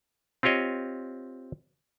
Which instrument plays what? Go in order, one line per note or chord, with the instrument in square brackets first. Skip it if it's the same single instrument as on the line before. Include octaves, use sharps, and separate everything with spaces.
[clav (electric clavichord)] C4 F4 G4 C#5 D#5